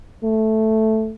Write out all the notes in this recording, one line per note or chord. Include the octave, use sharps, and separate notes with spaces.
A3